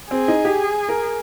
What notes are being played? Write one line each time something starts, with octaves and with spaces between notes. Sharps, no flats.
C4 G#4
D#4
G4
A#4